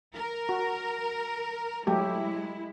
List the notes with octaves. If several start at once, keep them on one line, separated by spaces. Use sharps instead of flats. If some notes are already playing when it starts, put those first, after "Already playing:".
A#4
F#4
F#3 G#3 A3 E4 G4